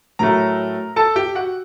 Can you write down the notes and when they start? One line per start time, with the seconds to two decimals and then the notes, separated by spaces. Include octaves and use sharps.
0.19 A2 F#3 A3 A#4 A#5
0.96 A4 A5
1.16 G4 G5
1.35 F#4 F#5